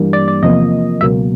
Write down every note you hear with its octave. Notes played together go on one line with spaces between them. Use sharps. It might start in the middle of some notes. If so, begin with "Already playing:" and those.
Already playing: G2 E3 G3 A#3
D5
D5
E2 C3 F3 A#3 D#5
C#2 B2 F#3 A#3 E5